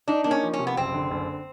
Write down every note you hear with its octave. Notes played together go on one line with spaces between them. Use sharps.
D4 D#4
A#3 D4
C#4
F3
C#4
C3
B3
F#1 C4
D3
F#1